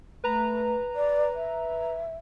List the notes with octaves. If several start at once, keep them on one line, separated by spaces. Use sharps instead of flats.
A3 B4 A#5
D5
E5